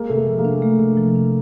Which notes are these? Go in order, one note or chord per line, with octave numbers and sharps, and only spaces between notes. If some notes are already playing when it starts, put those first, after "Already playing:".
Already playing: G#3 A#3
C3 A3
G#3 A#3
F3
G#3 A#3
D4
A3
C3
F3
D4